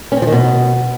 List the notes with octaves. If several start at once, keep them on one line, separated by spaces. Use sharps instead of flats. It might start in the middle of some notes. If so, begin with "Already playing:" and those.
C#4
C4
F3
D#3
B2